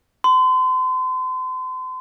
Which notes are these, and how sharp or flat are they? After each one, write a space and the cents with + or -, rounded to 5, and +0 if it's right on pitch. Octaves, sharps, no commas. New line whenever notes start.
C6 -40